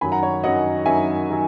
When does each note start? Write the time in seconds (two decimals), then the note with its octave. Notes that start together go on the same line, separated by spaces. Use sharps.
0.01 F#2 D#3 F#3 G#5 B5
0.12 F#5 A#5
0.23 C#5
0.44 F#2 D#3 F#3 D#5 F#5
0.86 F#2 D#3 F#3 E5 G#5
1.30 D#3 F#3